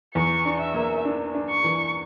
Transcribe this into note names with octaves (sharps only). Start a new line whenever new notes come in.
E2 C#6
D4
E5
A#3
D4
D4
C#6
E3